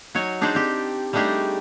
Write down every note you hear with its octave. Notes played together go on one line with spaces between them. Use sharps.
F#3 D#4 C#5 G#5
D4 D#4 G#4 B4 C5 D5
C4 G4
G3 A3 D4 D#4 G4 G#4